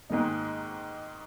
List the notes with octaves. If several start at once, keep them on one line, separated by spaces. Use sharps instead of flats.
G#2 D#3 G#3 A#3 D#4